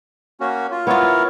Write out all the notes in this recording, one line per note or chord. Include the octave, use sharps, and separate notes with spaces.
A#3 C#4 F#4
F4
B3 E4 F4 A#4 C#5